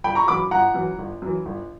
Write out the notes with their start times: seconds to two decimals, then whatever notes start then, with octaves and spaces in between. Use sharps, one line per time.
0.04 G1 G5 B5
0.15 A#5 C#6
0.28 F#2 E3 B5 D6
0.51 G1 F#5 A#5
0.74 F#2 E3
0.98 G1
1.22 F#2 E3
1.45 G1